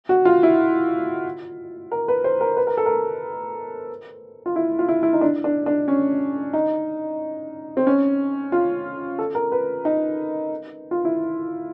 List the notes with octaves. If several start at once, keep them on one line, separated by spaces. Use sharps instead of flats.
F#4
F4
E4
A#4
B4
C5
A#4
B4
A#4
A4
A#4
F4
E4
F4
E4
E4
D#4
D4
D4
D4
C#4
D#4
C4
C#4
F4
A4
A#4
B4
D#4
F4
E4